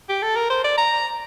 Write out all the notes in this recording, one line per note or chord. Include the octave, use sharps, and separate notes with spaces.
G4
A4
A#4
C5
D5
A#5